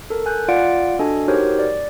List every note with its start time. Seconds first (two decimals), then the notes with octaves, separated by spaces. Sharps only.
0.10 A4 A#4
0.26 G#5 F#6 G6
0.48 F4 D5 F5 F#5 D7
0.99 D4 F#4 A4 D#5 G#5
1.28 D#4 F#4 G4 A#4 C5 C#5
1.59 D5